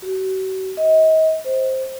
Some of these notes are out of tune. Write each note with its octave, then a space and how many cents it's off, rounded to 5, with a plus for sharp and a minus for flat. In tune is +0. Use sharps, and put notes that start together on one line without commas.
F#4 +40
D#5 +35
C5 +5